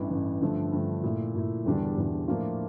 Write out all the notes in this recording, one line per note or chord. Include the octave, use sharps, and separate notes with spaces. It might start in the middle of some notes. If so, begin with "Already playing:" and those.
Already playing: A1 G2 E3
A1 G2 E3
G2 D3 F3 A3
G2 D3 F3 A3
A#2 A3 E4
A#2 A3 E4
E1 E2 D3 G3 D4
E1 E2 D3 G3 D4
A2 F3 A#3 D4 F4